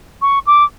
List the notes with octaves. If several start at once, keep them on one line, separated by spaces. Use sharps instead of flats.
C#6
D6